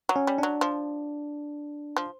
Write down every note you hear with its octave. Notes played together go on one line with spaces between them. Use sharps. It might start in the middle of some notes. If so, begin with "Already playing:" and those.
F#3
C#4
G3
F#3 D4
F3
F3